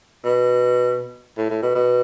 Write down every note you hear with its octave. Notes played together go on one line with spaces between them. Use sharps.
B2
A2
A2
B2
B2